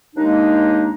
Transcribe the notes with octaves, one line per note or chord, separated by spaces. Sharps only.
D#2 G#3 A#3 D4 D#4